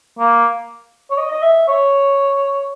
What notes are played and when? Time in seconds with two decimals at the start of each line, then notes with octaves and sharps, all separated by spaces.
0.19 A#3
1.11 C#5
1.18 D#5
1.31 D#5
1.42 E5
1.68 C#5